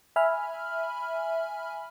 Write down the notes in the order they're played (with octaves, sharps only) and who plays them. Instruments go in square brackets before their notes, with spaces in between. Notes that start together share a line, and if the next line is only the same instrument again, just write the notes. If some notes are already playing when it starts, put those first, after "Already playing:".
[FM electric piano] E5 G#5 B5 F6